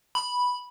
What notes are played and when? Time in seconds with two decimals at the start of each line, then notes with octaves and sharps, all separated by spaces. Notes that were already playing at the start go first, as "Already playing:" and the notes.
0.15 B5